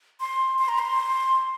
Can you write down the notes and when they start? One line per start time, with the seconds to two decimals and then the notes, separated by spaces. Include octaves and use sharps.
0.20 C6
0.59 C6
0.68 A#5
0.79 C6